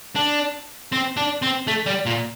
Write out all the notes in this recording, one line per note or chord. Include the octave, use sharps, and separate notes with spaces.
D4
C4
D4
C4
A3
G3
A#2